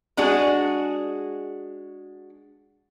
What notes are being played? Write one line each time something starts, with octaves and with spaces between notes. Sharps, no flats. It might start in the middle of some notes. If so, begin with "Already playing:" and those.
G#3 D4 F#4 G#4